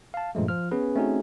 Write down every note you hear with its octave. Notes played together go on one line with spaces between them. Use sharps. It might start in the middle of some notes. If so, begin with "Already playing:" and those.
F5 A5
G2 A#2 F3 G#3 A3
F3 F4 F6
B3 C#4 G#4 B4
A3 C4 C#4 D#4 F#4 G#4